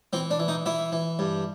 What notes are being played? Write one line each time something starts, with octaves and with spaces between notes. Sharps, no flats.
E3 C4
D4
E3
D#4
E3 E4
E3
G2